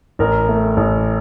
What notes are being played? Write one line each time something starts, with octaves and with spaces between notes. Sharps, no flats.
A1 A#4
A3
A1